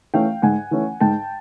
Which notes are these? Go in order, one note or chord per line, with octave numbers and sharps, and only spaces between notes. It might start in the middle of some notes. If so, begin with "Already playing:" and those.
E3 A3 C#4 F5 G5
G#2 F#5 G#5
E3 A3 C#4
G#2 G5 A5